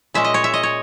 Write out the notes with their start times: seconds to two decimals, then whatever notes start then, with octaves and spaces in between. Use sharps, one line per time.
0.14 A#2 G#3 C#4 E5
0.24 D#5
0.34 C#5
0.44 E5
0.54 D#5
0.63 C#5